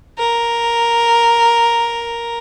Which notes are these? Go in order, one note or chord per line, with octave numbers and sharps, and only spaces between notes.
A#4